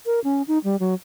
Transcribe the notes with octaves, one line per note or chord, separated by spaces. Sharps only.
A#4
C#4
D#4
G3
F#3